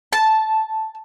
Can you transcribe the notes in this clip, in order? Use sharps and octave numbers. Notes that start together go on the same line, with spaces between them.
A5